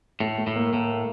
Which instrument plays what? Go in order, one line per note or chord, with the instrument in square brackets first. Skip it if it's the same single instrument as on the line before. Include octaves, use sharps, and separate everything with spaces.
[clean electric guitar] A2 [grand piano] A3
[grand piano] A3
[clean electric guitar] A2
[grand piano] A#3
[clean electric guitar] A2 [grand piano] A#3